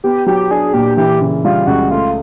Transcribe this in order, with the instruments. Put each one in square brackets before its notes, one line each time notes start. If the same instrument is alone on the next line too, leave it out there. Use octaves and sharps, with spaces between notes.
[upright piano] B3 [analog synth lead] G4
[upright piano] F#3 [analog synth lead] G4
[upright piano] D4 [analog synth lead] G#4
[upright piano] A#2 [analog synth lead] G4
[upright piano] E3 [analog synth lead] G4
[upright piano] C#3
[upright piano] G3 [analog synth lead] F4
[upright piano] C#2 [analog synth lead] F#4
[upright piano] A3 [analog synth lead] F4